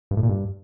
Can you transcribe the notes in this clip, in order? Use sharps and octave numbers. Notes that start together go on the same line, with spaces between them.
G2
A2
A#2
G2